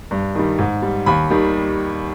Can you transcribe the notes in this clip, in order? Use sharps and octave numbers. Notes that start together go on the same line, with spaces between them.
G2
D#3 G3
G#2
G3
D#2 B5
D#3 G3